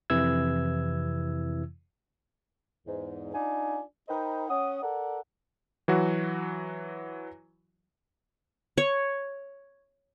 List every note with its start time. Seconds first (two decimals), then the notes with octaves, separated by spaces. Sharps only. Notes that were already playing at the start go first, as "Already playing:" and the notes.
0.10 F2 C3 E3 E4 E6 G#6
2.87 E2 G#2
3.33 D4 D#4 F4 G#5
4.08 D#4 A#4 C5 D#5 G5 B5
4.49 C#4 F#5 D#6
4.82 A4 A#4 D5 F#5
5.88 E3 F#3 F#4
8.78 C#5